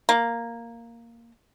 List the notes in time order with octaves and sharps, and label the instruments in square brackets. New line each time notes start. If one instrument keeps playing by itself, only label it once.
[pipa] A#3